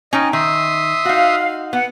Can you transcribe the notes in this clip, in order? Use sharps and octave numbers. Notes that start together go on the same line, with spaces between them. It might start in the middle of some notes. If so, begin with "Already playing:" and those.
C#4 D#4 D#5 G5
D#3 E5 C6 D#6
D#4 F#4 F5
B3 F#5